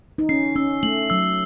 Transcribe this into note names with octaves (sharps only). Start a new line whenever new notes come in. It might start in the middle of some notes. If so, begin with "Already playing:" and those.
D#4
C#4 C7
C#4 E6
A3 F#7
F#3 E6